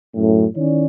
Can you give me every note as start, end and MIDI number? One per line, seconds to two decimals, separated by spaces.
0.15 0.45 42
0.15 0.45 45
0.56 0.86 51
0.56 0.86 61
0.56 0.86 64
0.56 0.86 73
0.56 0.86 74